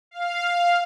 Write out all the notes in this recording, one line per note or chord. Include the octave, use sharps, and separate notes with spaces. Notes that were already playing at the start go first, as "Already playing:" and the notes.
F5